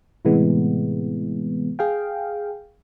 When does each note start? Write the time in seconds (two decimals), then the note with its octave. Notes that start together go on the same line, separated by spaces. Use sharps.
0.25 A2 C3 E3 G#3 B3
1.79 G#4 F5 G5